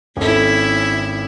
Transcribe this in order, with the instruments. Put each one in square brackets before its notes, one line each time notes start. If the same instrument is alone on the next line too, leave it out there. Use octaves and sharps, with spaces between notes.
[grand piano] G#1 A4 [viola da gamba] C#4 E4